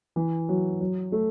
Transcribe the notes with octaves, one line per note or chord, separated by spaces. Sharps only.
E3
F#3
F#3
A3